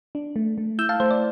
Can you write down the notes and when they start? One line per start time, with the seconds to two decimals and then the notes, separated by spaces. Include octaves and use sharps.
0.15 D4
0.36 A3
0.58 A3
0.79 E4 E6 G6
0.89 F5 A5
1.00 A3 C5
1.11 D5